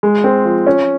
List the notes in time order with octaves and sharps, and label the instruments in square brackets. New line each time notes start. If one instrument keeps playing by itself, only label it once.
[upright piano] G#3
C4
F3
C#4